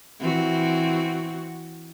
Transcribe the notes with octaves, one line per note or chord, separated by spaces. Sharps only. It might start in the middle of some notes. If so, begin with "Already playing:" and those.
E3 C4 F#4